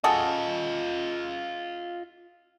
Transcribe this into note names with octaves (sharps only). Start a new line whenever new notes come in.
F4 F#4 G#4 A4 D#5